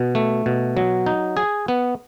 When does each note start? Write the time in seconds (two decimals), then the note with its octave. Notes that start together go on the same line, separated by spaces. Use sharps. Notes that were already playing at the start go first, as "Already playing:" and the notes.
Already playing: B2
0.15 A3
0.46 B2
0.77 F#3
1.06 D#4
1.37 G#4
1.68 B3